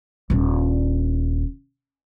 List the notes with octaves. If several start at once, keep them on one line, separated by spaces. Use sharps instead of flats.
D#1 D4